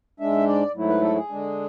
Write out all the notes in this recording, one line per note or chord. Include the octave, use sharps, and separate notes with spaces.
G#2 G#3 D4 E5
D5
G#2 F#3 A3 E4
B4
A4
G#4
D3 G#3 D4